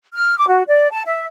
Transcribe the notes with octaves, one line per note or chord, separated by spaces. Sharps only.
F6
D6
F#4
D5
A5
E5